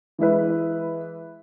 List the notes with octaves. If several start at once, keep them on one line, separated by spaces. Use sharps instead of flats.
E3 G#3 E4 B4